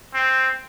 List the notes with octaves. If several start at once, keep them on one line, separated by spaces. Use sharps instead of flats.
C4